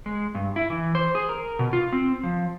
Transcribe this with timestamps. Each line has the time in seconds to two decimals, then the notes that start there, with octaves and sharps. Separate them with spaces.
0.06 G#3
0.35 G2
0.56 E4
0.70 E3
0.95 C5
1.15 G#4
1.29 A#4
1.59 B2
1.73 F4
1.93 C4
2.23 F3